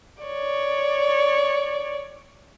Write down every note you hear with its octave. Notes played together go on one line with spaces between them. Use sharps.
C#5 D5